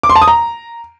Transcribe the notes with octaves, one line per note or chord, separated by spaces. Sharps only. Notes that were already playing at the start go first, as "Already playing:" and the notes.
D6
C6
A5
D#6
A#5